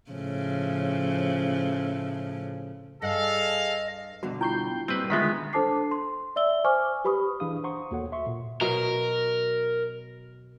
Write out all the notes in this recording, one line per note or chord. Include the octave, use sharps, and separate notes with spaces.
A2 C#3 F3
G2 G#4 A4 D#5 F5
G2 B2 D3 F#4
E4 F4 G5 C#6 G6 C7
A#2 G3 C4 B4
D3 D#3 G#3 B3 F4 E5 F#5 B6
D4 A4 C5 A5 D6 C7
C6
D5 E5 E6 G7
C5 G#5 C#6 D6 F6
G4 B4 B5 C#6 D#6
E3 D4 G#4 F5 D#6
C5 F#5 A#5 C6 C#6 D#6
D#2 A#3 F#4 A4 C#5 F#5
E5 C6 C#6
A#2
B2 F#3 F#4 A#4